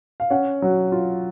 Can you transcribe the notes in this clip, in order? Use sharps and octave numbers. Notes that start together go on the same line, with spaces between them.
F5
C#4 F#5
F#3
F4